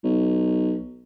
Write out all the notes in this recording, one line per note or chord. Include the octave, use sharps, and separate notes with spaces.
B1